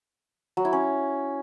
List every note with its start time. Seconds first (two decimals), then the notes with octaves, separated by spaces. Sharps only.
0.57 F#3
0.65 E4
0.73 C#4